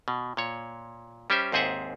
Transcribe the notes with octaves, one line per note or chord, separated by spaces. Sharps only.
B2
A#2 C#5
G3 C#4 G4 C5 E5
D#2 G#2 C4 G#4 E5 F#5